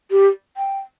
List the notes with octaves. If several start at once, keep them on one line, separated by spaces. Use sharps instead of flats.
G4
G5